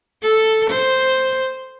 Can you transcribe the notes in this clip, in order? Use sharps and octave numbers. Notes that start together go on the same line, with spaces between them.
A4
C5